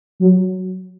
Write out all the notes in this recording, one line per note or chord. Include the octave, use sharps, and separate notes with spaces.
F#3